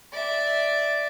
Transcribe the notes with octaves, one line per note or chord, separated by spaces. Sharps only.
D5 E5